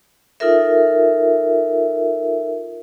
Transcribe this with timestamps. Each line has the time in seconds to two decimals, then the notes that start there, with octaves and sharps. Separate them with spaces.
0.40 D#4 F4 A4 A#4 E5